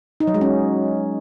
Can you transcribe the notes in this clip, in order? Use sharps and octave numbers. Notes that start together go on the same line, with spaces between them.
D#4
F#3
G#3
C#4